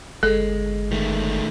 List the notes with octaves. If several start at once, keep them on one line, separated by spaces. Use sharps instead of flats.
G1 G#3 A4
D#3 A3